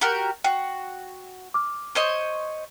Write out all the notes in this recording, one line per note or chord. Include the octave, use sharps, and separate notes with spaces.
F#4 G4 A#4
F#4 G5 C7
D6 F6
C5 C#5 D#5